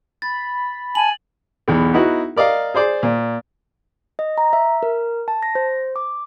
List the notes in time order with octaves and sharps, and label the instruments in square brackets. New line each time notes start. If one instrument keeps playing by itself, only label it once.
[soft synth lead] B5 [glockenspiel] A6
[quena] G#5 [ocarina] A5 [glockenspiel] F#7
[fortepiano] B1 E2
B3 D#4 E4 F#4
A#4 D5 D#5 F5
G#4 C5 D5
A#2
[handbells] D#5
A#5
E5
A#4
A5
A#6
C5
D6